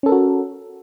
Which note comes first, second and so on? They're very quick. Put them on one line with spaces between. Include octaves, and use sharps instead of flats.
C#4 A4 A#4 F#4